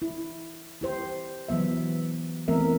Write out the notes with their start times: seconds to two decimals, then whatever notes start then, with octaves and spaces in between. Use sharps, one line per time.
0.02 E4
0.81 E4 G4 C5
1.48 E3 F#3 B3 E5
2.48 E3 A3 B3 C4 A#4 E5